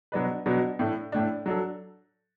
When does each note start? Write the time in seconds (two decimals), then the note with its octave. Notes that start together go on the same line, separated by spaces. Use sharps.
0.12 B2 F#3 D4 B4
0.46 B2 F#3 D4 B4
0.79 A2 A3 D4
1.12 A2 A3 D4
1.46 F#3 D4 A4